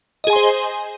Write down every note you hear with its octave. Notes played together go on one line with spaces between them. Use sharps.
G#4 C5 D#5 G#5 C6